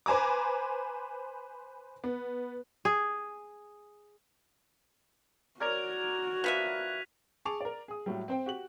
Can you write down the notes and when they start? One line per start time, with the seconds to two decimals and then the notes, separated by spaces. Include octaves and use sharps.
0.06 B4 C5 G#5 A#5 D6
2.04 B3
2.85 G#4
5.60 F#4 A#4 C#5 D5 F6 G#6 F7
6.44 F3 B3 E5 F#6 B6 D#7
7.45 G#4 A5 C#6 D6 F7
7.61 A#4 D5
7.88 G#4 D#6
8.06 A2 F#3 G3
8.28 C4 C5 G5
8.46 F#4 G4 F#7